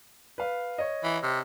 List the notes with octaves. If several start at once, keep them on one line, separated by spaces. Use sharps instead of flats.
B4 F5
C#5 D#5
E3
C3